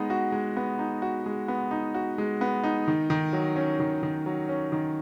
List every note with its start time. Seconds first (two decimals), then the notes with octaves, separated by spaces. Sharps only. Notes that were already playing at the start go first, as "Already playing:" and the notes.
Already playing: G#3 B3 D#4
0.10 F#4
0.32 G#3
0.57 B3
0.79 D#4
1.02 F#4
1.26 G#3
1.48 B3
1.71 D#4
1.94 F#4
2.18 G#3
2.41 B3
2.64 D#4
2.88 D#3
3.10 D#3
3.33 F#3
3.56 C#4
3.80 D#3
4.03 D#3
4.26 F#3
4.49 C#4
4.72 D#3